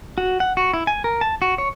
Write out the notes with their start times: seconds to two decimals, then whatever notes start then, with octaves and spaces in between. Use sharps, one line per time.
0.18 F#4
0.40 F#5
0.57 F#4
0.73 E4
0.87 G#5
1.04 A#4
1.21 A5
1.42 F#4
1.58 C#5